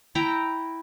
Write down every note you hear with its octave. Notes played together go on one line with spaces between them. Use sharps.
E4 G5 A#5